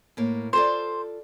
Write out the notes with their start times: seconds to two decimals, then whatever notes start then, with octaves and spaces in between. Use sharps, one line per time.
0.17 A2 A#3
0.53 F4 A4 C5 D5